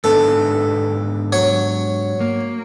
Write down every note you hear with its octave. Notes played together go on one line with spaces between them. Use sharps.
G#2 B3 D4 A4
F#3 C#5
A#3